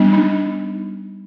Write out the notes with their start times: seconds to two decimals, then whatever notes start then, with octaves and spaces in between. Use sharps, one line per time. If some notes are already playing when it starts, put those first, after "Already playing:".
Already playing: G3 B3 D4
0.13 D#4